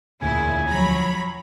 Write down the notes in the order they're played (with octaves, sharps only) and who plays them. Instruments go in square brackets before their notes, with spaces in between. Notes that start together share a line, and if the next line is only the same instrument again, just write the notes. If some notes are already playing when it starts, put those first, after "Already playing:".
[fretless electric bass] E1 D2 [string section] A#2 C#3 E4 [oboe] G#5
[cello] F3 F#3 [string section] C#5 A#5 B5